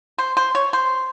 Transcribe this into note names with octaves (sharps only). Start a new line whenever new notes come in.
C5
C5
C#5
C5